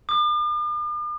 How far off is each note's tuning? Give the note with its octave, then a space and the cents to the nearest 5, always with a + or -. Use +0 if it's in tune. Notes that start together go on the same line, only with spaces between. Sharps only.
D6 +45